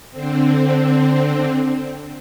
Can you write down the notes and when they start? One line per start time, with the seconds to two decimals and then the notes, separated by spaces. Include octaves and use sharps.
0.11 D3 C4